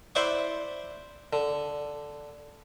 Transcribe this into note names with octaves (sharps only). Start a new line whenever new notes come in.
E4 C5 D5 F#5 C#6
D3